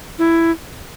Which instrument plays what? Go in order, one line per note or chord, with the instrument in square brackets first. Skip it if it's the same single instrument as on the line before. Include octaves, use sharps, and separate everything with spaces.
[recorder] E4